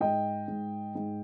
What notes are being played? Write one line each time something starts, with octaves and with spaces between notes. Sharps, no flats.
G#2 D#5 G5
G#2
G#2